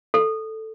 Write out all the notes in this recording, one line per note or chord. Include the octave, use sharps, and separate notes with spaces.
A4